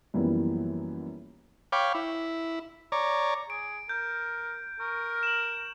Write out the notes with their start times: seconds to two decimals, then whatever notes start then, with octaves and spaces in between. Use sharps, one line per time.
0.14 F#2 E3 F3 G3 A#3 B3
1.72 C#5 F5 G5 B5 D6
1.95 E4
2.92 C#5 D5 A#5
3.50 G#4 D7
3.89 A#4 G6
4.80 A#4 C#6
5.23 E7 F#7